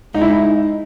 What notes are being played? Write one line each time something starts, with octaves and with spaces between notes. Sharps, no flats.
G#3 D#4
E4
D#4